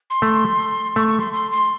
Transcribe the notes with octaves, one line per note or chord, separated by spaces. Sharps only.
C6
A3
A3 C#6
C#6
C6
C6
C6